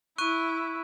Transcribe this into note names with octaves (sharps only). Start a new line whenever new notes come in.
E4 C#6 F#6 D#7